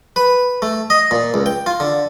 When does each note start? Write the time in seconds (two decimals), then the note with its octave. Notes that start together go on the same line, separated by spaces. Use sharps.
0.16 B4
0.62 A3
0.90 D#5
1.11 A#2
1.34 C#2
1.46 G5
1.66 F4
1.80 D3